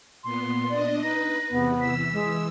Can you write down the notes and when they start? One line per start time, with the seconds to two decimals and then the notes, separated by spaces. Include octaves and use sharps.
0.24 A#2 B3 C6
0.70 D4 D5 D#5
1.02 D#4 B4 A#6
1.50 E2 C3 B3
1.81 E3 E6 B6
2.12 G#3